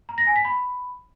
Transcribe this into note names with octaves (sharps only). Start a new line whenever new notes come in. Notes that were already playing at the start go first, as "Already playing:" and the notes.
A#5
A#6
G#5
B6
B5